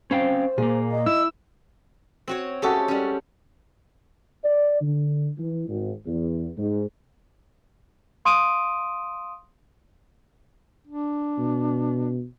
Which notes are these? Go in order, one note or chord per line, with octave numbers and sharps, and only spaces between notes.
C4 C#4 C5 F5 G5
A#2 A#3 G#4
D#5
E4 E6
C4 F#4 C#5
G#3 A3 C#4 F#4 G4 A4
G3 C#4
D5
D3
E3
G#1
E2
G#2
F5 C6 D#6 D7 D#7
D4
B2